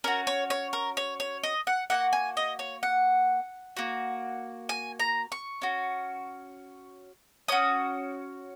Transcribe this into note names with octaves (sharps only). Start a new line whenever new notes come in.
C#4 F#4 A#4
C#5
C#5
A#4
C#5
C#5
D#5
F#5
A#3 D#4 F#4 F#5
G#5
D#5
C#5
F#5
A#3 F#4
G#5
A#5
C#6
C#4 F#4
C#4 F#4 D#6